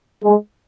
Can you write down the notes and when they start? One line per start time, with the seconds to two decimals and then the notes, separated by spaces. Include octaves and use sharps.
0.24 G#3